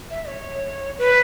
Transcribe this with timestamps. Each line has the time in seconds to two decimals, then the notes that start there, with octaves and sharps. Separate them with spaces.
0.11 E5
0.28 C#5
0.98 B4